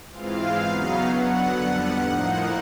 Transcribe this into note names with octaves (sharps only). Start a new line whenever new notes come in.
G#2 E3 G#3 C4 F4 F5
E2 C#3 F#3 B3 D#4
D3 F#3 B3 F#5
F2 D3 G3 B3
A2 F3 A#3 D#4